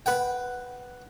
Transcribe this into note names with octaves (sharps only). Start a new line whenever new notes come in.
B4 F#5 G5